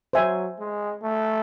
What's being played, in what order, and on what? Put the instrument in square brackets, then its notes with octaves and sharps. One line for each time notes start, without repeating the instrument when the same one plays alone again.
[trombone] F#3 [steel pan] C5 E5 G#5
[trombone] G#3
A3